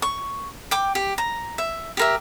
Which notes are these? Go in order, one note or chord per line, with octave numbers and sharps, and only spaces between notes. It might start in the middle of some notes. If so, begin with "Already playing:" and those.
C#6
G5 D6
G4
A#5
E5
G4 A#4 E5